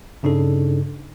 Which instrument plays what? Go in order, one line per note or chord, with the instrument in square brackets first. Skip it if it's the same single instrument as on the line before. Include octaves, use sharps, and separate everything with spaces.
[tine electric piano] G2 C#3 D4 D#4 A4